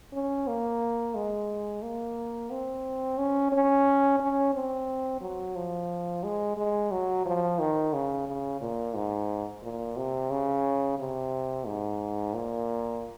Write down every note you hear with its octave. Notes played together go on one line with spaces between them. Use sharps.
C#4
A#3
G#3
A#3
C4
C#4
C#4
C#4
C4
F#3
F3
G#3
G#3
F#3
F3
D#3
C#3
C#3
A#2
G#2
A#2
C3
C#3
C3
G#2
A#2